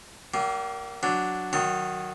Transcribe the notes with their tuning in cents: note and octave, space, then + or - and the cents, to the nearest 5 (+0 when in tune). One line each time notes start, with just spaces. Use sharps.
G3 -45 A#3 +0
F#3 +0 D4 +0
D#3 -10 F#3 +0 A5 +25